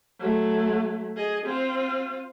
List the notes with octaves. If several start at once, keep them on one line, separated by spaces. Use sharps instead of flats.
F#3 A3
G#4 D#5
C4 F4